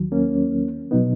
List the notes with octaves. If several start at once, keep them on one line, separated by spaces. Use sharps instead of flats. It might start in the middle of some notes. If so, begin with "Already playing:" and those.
Already playing: D#2 D#3 F#3
A#3 C#4
B2 F#3 B3 D#4